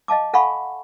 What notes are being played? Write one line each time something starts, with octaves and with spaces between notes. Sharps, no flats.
D#5 F5 A5 D6
A4 F5 F#5 G#5 B5 C#6